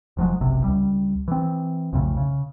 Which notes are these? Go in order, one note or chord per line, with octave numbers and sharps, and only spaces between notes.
F1 F3 F#3 G#3
F#1 B1 C3
C#2 G3
E3 C4
B1 F2 C#3 A3
C#3